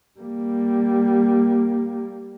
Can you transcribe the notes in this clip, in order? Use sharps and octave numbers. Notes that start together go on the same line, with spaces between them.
G3 A#3